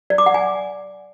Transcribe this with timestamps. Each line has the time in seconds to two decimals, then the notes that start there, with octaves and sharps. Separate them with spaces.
0.10 D5
0.18 D6
0.26 F#5
0.34 G#5